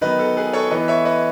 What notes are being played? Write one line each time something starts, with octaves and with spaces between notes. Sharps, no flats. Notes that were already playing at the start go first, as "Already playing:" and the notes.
D#3 F#3 B3 B4 D#5
A4
G#4 B4
A4 C#5
E3 B3 B4 D#5
C#5 E5
B4 D#5